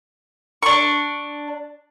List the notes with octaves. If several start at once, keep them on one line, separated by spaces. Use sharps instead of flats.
D4 C#6